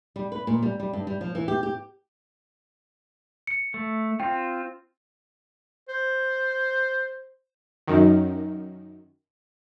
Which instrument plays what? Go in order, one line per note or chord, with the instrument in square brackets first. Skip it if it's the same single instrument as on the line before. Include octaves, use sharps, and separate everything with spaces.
[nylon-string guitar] G3
B4
A#2
G3
G3
G2
G3
F3
E3
G4
G4
[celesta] C#7
[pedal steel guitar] A3
[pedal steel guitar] C4 F4 [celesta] G5
[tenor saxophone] C5
[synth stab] F#2 D#3